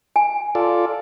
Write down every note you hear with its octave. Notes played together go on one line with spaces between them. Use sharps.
G#5
F4 A4 D5